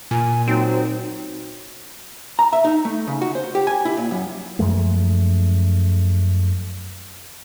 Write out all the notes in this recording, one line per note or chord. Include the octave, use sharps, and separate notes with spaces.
A#2 G#5
F#3 C4 D#4
A#5
E5
D#4
A3
C#3
F#4
C5
G4
G#5
E4
A#2
F#2
F#2 F3 G#3 A3